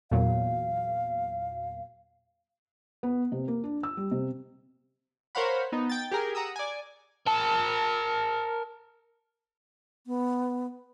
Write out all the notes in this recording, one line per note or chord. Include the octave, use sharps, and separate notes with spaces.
E2 A#2 F#3 F5
B3
C3
A#3
D4
E6
G3
C3
A#4 C5 C#5 F5 F#5 B5
B3 D#4
G5 A6
G4 G#4 A#4
F#5 A#5 D#6 E6
D5 G#5
A#4 A5
B3